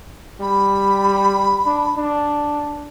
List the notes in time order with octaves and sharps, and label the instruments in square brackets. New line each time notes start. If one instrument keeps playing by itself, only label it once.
[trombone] G3 [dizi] B5
[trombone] D4
D4